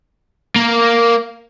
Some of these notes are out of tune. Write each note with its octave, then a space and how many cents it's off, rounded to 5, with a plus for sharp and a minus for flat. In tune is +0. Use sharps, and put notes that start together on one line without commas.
A#3 -5